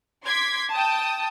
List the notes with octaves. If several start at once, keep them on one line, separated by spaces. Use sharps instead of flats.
C6 D6 G#6 B6
G5 A5 D#6